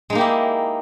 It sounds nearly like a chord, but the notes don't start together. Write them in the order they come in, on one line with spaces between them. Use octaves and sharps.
G#3 D#4 A#3 G4 E4